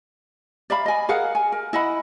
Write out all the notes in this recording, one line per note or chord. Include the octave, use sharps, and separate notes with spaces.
D5 E5 F5 B5
D#5 G#5
G#4 A#4 F5 F#5
G#5
A#4
E4 D#5 F#5 B5